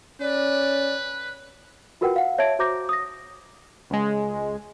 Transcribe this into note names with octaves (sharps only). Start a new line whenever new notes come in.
C#4 B4 D5
F4 F#4 A#4 B4 F#5 G5
F5 F#5
C#5 E5 A5 G#6 D7
F#4 C5 A#5 D6 G6 A#6
D#6 A#6
C#2 G#3